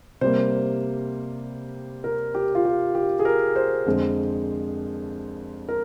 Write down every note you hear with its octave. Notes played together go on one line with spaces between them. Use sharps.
C3 G3 A#3 C5
A#4
G4
F4
G4
G4
G#4
A#4
C5
F2 D3 G#3
A#4